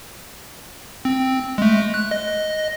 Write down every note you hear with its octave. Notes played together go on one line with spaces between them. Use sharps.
C4
G#3 A3
F#6
D#5